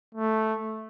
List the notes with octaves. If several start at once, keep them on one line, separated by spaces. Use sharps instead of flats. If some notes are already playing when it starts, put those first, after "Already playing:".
A3